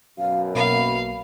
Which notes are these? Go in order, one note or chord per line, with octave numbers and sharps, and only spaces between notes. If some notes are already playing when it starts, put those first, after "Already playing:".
F#2 B2 F5
B1 A#3 F5 B5